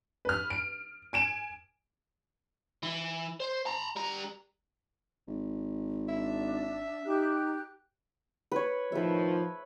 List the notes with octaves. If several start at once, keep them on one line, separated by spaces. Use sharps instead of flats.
B4 F6
D7
G#5 D7 E7
E3
C5
A5 A#5
G3 A#5
G#1
D4 E5
D#4 G4 F#6
B4 C#5
A2 D#3 F3 B4 E5